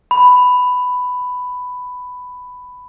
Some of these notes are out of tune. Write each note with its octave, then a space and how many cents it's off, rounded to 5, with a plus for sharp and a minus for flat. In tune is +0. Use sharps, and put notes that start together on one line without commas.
B5 +10